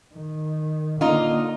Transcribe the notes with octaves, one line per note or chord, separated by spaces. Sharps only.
D#3
D3 A#3 D#4 F4